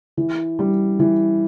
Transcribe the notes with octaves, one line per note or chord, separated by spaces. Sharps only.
E3
G3
E3